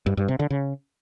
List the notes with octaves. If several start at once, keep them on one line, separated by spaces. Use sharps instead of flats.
G2
G2
C3
D3
C#3